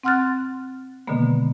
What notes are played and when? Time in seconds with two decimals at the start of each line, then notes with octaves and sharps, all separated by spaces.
0.04 C4 F#5 C6 F6 F#6 A6
1.07 B2 D3 D#3 G#3 A#3 B3